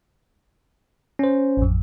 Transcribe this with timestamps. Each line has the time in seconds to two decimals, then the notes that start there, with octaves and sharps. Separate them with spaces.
1.19 C#4 C5
1.57 A1 F2